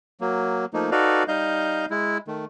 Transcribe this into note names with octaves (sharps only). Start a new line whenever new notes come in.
F#3 A#3
F3 A3 A#3 D#4
D#4 F#4 A4 B4 D5 F5
G3 D#4 D#5 F5 G6
G#3 E4
D#3 A3